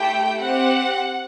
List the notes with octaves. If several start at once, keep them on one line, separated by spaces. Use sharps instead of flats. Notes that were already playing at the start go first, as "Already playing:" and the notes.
Already playing: A3 E4 G4 G5
C4 G4 F#5